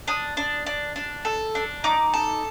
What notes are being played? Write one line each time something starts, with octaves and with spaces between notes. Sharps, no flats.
D4 D#6
D4
D4
D4
A4
D4
D#4 D6
A4